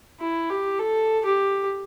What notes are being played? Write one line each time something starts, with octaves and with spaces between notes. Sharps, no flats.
E4
G4
A4
G4